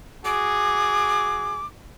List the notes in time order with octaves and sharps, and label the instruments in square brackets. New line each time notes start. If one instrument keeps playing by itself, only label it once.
[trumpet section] F#4 G#4 [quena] D6